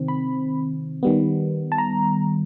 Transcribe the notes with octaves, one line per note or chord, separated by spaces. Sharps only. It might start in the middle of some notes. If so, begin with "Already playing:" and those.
Already playing: C3 D#3 C4
B5
D#3 G3 B3
A5
A#5